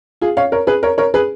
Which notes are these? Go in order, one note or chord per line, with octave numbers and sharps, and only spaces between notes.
F4 G#4
C#5 F5
A#4 C#5
G#4 B4
A#4 C#5
A#4 C#5
G#4 B4